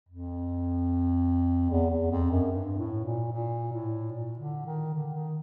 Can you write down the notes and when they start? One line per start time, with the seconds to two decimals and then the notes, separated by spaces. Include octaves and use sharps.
0.09 F2
1.70 E2
1.90 E2
2.11 F2
2.31 F#2
2.52 G2
2.78 A2
3.05 A#2
3.32 A#2
3.72 A2
4.13 A#2
4.39 D3
4.66 D#3
4.94 D3
5.14 D#3